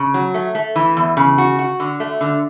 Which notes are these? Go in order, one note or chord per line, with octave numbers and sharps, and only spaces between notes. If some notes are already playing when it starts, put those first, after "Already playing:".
Already playing: C#3
F#3
A3
A3
E3
E2
C#3
F#4
F#4
D3
A3
D3